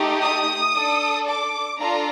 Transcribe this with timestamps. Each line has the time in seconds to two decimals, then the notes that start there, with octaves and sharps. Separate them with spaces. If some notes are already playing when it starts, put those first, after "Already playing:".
Already playing: A3 D#4 G4
0.22 D#6
0.75 D4 A4
1.28 D6
1.80 D4 F4 A4 A#5